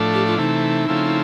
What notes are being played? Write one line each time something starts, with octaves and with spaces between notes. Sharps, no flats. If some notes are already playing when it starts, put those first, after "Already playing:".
Already playing: A2 F3 A3 D4
G4
F4
C3 E3 A3 D#4
C#3 F3 A3 C4 E4